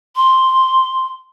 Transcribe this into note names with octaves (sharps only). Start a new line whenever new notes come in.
C6